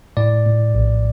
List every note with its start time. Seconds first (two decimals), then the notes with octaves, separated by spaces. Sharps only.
0.17 A2 D5
0.46 A2
0.75 A#1